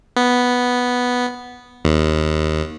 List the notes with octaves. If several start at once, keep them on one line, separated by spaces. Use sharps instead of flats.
B3
D#2